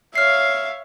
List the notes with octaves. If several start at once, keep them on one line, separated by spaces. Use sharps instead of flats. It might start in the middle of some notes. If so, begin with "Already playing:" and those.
C#5 E5 F5 F6 C7